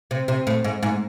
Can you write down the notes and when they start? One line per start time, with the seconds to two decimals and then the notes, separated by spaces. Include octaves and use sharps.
0.11 C3
0.28 C3
0.47 A2
0.64 G#2
0.83 G#2